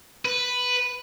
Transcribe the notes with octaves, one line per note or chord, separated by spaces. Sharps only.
B4